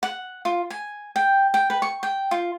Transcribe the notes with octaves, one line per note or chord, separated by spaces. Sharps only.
F#5
F4
G#5
G5
G5
B4
C#6
G5
F4